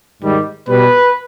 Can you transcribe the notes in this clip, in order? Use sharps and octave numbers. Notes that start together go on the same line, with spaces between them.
G#2 D#3 G3
B2 G3 B4